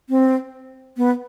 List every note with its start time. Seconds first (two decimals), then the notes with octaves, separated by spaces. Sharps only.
0.09 C4
0.97 B3